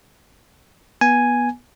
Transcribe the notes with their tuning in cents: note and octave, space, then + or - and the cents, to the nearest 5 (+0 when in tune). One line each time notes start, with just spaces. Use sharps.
B3 -20 G#5 +0